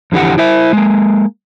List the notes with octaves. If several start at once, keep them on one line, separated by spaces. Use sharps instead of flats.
F2 D3 E3 G4 F#5
E4 C5 E5
G#3 A#3